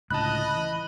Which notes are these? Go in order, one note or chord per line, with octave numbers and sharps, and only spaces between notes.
C#2 A2 D3 D#5 A5 B5 F#6
E3